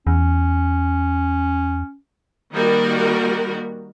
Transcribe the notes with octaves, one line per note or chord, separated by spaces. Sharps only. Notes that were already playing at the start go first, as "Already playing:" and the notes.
E2 C#4
D#3 G3 A#3 F#4 A#4